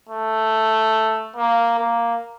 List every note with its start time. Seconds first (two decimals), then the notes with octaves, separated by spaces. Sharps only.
0.09 A3
1.36 A#3
1.78 A#3